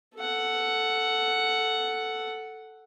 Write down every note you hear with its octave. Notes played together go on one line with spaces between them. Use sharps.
A4 F#5